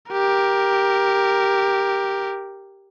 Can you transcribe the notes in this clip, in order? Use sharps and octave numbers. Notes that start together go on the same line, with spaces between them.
G4 A#4